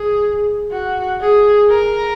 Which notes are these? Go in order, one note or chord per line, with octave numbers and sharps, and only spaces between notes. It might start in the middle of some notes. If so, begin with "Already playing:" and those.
Already playing: G#4
F#4
G#4
A#4